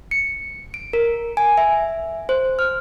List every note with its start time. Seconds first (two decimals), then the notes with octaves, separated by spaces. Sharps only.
0.11 C#7
0.74 D7
0.93 A#4
1.37 G#5
1.57 E5
2.29 C5
2.59 F6